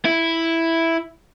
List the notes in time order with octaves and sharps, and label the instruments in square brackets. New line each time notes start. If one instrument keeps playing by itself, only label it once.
[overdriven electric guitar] E4